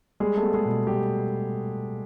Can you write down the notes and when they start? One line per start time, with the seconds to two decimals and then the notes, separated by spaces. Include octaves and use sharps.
0.20 G3 G#3 G#4
0.37 A3 A4
0.42 B3
0.54 G#3 G#4
0.65 B2
0.87 G3 G4